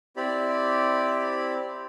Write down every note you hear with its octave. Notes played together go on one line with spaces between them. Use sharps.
C4 E4 G4 D5 B5